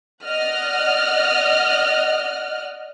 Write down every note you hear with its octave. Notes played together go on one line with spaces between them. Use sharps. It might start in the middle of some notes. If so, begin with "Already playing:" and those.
D5 D#5 F#5 F6 F#6